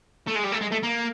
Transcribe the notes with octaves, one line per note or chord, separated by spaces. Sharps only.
A3
G#3
G3
A3
G#3
A3
A#3